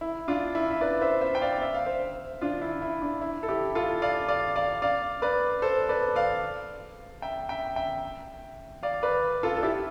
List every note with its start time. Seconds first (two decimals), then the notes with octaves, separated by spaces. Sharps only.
0.01 E4
0.28 D4 F4
0.55 E4
0.70 E5
0.81 B4 D5
1.01 C5 E5
1.21 C5 E5
1.35 G5
1.42 D5 F5
1.62 E5
1.74 F5
1.86 C5 E5
2.41 D4 F4
2.62 E4
2.82 E4
3.02 D4
3.22 E4
3.43 A4
3.48 E4 G4
3.75 F4 A4
4.02 D5 F5
4.29 D5 F5
4.56 D5 F5
4.82 D5 F5
5.22 B4 D5
5.62 A4 C5
5.89 B4 D5
6.16 D5 F5
7.22 E5 G5
7.49 E5 G5
7.76 E5 G5
8.83 D5 F5
9.03 B4 D5
9.43 F4 A4
9.57 A4
9.63 E4 G4